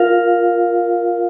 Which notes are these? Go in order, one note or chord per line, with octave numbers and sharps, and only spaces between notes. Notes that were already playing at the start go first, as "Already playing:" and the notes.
Already playing: F4 A#4 F5